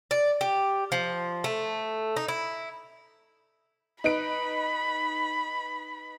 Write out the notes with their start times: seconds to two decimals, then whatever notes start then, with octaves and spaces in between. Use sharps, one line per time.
0.11 D5
0.41 G4
0.92 F3
1.44 A3
2.16 D#4
2.28 E4
4.04 D#4 B4 B5 D7